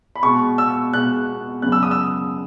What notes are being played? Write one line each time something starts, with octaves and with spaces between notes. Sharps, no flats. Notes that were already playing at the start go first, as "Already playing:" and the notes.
B5
B2 G#3 B3 C#6
E6
B2 G#3 B3 F#6
F#2 C#3 G#3 B3 F#6
E6
D#6
E6